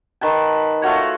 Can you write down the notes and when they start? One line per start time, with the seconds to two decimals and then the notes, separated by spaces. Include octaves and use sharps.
0.21 D#3 B4 A5
0.82 A3 F4 F#4 C#5